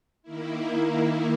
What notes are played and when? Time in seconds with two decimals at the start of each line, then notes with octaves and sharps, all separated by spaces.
0.23 D#3 A#3 E4